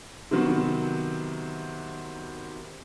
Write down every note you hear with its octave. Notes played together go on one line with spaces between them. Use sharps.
C3 D#3 F#3 B3 C4